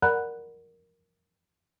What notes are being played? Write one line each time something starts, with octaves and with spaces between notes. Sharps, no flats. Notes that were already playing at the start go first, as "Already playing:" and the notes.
A#4 D5 F#5 A#5 B5 F#6